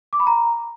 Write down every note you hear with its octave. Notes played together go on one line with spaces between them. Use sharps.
D6
B5
A#5